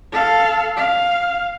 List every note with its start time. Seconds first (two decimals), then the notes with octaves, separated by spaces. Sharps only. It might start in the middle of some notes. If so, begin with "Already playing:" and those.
0.12 A4 F5
0.77 F5